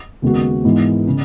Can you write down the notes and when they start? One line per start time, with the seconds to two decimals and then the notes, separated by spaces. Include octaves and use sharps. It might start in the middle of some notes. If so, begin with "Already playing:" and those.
0.22 D#2 C#3 G#3 B3 F#4
0.64 G#2 E3 G#3 B3
1.08 C#3